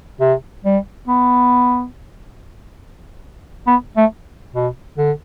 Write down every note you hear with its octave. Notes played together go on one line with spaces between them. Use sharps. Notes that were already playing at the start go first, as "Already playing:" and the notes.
C3
G3
B3
B3
A3
B2
D3